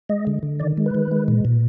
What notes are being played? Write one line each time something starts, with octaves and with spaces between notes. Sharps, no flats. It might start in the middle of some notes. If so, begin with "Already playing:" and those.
G#3 D#5
D3
D3
D#3 D5
G#3
B4
D#3
G#3
A#2
A#2